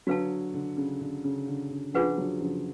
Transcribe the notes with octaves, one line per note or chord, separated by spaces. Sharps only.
D3 F#3 F#4 B4 F5 A5
D3
C#3
D3
C#3
D3
D3
C#3 F3 D4 F4 G#4 B4 F#5
D3 F#3
C#3 F3